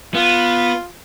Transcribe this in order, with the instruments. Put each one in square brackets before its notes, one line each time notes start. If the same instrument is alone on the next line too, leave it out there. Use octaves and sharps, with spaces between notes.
[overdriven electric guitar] B3 [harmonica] F4